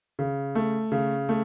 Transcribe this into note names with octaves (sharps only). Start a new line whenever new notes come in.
C#3
A3
C#3
A3